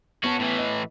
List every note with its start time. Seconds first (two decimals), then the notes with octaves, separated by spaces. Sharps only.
0.24 B3 C#4 F#4 A5
0.40 A2 E3
0.59 D#5